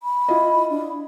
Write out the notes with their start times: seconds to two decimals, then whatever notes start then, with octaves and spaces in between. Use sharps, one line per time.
0.03 B5
0.28 E4 F4 D#5
0.70 D4